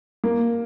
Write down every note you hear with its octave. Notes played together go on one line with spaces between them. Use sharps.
A#3